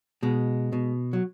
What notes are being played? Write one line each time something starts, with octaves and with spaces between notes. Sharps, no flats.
B2 G#3
B2
F#3